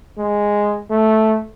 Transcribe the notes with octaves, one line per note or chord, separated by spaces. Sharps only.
G#3
A3